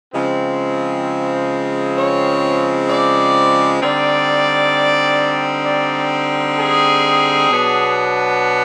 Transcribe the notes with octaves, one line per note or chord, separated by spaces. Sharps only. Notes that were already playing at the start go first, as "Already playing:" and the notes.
C#3 F3 G#3 C4
C#5
D5
D3 G3 C4 D#4 D5
D5
G#4
B2 F#3 B3 D4